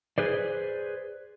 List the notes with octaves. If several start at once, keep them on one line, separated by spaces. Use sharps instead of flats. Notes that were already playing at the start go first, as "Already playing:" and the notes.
G#4 B4 C5 D5